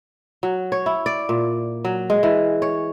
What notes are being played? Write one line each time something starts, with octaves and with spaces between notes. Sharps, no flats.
F#3
C#5
E4
D5
A#2
F#3
G#3
E3
C#5